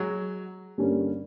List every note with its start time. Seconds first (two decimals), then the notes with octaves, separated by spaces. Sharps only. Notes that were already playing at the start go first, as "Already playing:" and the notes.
Already playing: F#3 G#3
0.78 G2 D3 G3 A#3 C#4